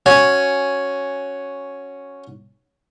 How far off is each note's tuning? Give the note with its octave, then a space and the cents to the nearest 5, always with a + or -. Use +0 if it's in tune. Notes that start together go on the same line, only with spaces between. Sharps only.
C#4 +0 F#4 +0 G#5 +5